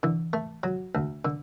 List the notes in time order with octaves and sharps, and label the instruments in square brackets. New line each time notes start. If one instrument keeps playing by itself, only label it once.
[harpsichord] D3 [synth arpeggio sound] E3
[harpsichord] A3
F#3
D2
D3